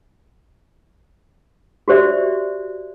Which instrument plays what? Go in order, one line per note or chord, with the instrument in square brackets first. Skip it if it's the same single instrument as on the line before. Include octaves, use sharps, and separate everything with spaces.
[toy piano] F#4 G4 C5 D5 E5